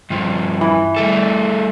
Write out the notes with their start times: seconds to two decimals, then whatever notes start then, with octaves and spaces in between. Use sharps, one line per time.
0.10 G2 F3
0.61 E3
0.97 G3 A3 A4